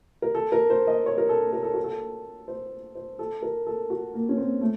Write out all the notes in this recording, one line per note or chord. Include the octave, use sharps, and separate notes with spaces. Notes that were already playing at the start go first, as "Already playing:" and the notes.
A#4
A4
A#4
C5
D#5
C#5
A#4
A4
A#4
A4
F#4
A4
C5
C5
A4
A#4
A4
F#4
A#3
C#4
C4
A3